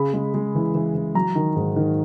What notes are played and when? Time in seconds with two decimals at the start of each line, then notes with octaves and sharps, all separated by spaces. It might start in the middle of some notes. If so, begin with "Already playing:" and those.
Already playing: C#3 B5
0.14 G#3
0.34 G#3
0.55 E3
0.75 E3
0.95 E3
1.15 F#3 A#5
1.35 D#3
1.56 G#2
1.76 D#3